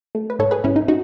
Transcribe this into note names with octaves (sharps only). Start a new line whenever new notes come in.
A3
B4
G#2 A4 C#5
G#4 B4
G#2 C#4 E4
D#4
D#4 F#4